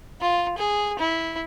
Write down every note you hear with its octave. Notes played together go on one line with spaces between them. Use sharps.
F4
G#4
E4